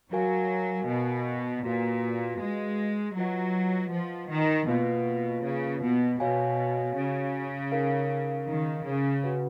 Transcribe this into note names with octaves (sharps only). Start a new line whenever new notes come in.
F#3 F#4 A#4 F5 G#5
B2
A#2 F#4 B4 F5 G#5
G#3
F#3 F4 B4 D#5 F#5
F3
D#3
B2 A#3 F4 B4 F5
C#3
B2
B2 F#4 C#5 F5 G#5
C#3
D#4 A#4 F5
D#3
C#3
F#4 B4 F#5